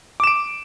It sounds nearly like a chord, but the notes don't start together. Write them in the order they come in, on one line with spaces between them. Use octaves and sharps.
D6 E7 D7